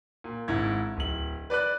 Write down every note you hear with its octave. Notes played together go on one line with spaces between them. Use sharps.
A#2
G#1 G#2 E4 G#6
D1 F#7
B4 D5 B5 F#6